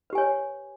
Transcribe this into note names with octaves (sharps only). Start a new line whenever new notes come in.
G4 B4 C#5 G#5